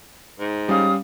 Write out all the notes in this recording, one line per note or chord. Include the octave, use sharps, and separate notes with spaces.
G#2
G3 C#4 F5 D#6